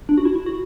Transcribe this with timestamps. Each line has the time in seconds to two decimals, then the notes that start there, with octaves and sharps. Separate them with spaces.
0.09 D4
0.18 F#4
0.25 E4
0.35 E4
0.46 F#4